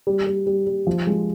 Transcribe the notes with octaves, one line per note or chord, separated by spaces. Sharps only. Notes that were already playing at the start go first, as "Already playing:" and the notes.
G3
G3
G3
G3
F3
G#3